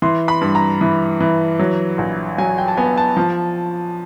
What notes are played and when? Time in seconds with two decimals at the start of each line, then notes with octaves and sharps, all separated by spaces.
0.02 E3 C6
0.28 B5
0.41 G2
0.55 A#5
0.81 E3
1.21 E3
1.59 F#3
1.98 A#1
2.38 F#3 G#5
2.58 G5
2.68 A5
2.77 B3 G#5
2.97 A5
3.17 F3